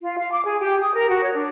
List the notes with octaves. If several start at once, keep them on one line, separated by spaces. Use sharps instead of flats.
F4
F5
D6
G#4
G4
D#6
A#4
F#4
C#5
D4